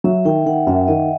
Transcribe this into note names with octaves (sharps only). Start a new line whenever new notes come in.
F#3 E5
D#3 G5
D#3 F#5
F#2 E5
D#3 D#5